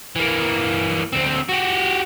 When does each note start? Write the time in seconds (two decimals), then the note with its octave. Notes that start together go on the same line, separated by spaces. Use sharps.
0.16 E3 A#3
1.13 D2 C4
1.49 F#4 G4